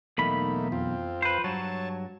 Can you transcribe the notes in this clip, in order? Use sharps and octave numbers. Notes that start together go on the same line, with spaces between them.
B1 E2 A3 A#3 D#4 B5
F2 C4 F4
B4 C5
G2 F#3 C#5 A5